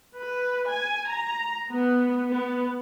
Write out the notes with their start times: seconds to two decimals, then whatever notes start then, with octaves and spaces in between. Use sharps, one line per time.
0.17 B4
0.68 G#5
1.09 A#5
1.71 B3
2.26 B3